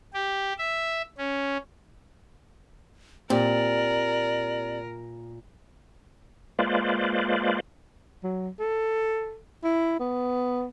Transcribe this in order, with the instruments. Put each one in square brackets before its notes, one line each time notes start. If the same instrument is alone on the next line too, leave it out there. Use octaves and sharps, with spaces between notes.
[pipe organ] G4
E5
C#4
[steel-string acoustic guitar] A#2 [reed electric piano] C4 G4 [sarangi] A#4 [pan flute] D5
[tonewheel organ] G#3 A#3 F4 B4 C5 D5
[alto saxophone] F#3
A4
E4
B3